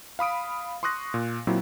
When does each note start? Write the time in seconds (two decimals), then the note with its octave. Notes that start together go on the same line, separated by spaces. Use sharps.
0.19 F5 B5 D#6 D7
0.83 C6 C#6 D#6 F#6 A#6
1.14 A#2
1.47 A#2 F#3 C4 E4